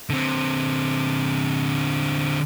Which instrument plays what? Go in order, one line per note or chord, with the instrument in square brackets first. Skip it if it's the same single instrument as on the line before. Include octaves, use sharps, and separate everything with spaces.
[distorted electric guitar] D3 C4